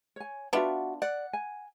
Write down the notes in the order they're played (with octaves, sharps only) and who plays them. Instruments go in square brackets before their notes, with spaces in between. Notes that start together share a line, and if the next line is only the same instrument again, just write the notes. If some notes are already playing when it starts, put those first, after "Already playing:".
[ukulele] C#5 G#5
[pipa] B3 D4 F4 [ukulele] F#4 E5 F#5
[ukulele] D5 [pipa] F#5
[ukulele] G#5